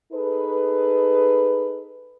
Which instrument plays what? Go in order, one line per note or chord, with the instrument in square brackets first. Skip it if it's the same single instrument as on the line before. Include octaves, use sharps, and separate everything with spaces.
[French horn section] D#4 G#4 A4 B4